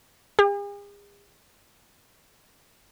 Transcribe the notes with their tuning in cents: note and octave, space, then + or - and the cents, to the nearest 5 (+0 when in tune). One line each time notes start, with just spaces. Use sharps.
G#4 -45